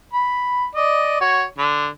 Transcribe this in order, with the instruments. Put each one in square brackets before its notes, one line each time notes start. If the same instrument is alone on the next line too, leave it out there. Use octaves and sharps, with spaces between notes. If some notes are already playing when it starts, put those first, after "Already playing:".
[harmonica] B5
D5 D#5
F#4 C#5
D3